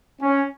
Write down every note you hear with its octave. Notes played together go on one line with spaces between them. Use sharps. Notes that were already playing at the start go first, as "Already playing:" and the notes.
C#4